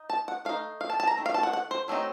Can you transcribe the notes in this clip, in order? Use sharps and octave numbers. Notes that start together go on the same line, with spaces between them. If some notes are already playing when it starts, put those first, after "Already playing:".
Already playing: D#4
A5
F#5
A3 D#4 F5
F5
A5
A5
A#5
D#3 A3
F5
A5
F#5
F#5
C5
F#3 A3 C4 D#4